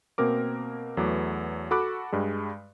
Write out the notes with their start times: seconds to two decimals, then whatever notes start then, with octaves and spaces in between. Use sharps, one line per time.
0.18 B2 A#3 C4 A#4 D6
0.97 E2 F#3 A3 B3 D6
1.71 F#4 A4 B5 D6 F#6
2.12 G2 G3 G#3